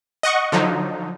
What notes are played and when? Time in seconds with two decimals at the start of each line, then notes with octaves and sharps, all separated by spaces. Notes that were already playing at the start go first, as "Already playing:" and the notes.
0.23 D#5 F#5 C#6
0.52 D3 F3 F#3 D#4